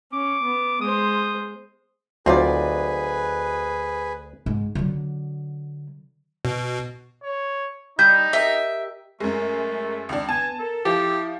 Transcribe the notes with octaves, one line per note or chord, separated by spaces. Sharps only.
C#4 D6
B3
G#3 C5 D#6
D2 F#3 C4 D#4 F4 G#4 B4 D5
G#2
D3 F#3
B2
C#5
G3 D#4 G6
G4 A#4 D#5 E5
F#2 G#3 A3 A#4
C#2 D#3 D4
B3 G#5 A5
A4 A#4
F3 E4 G4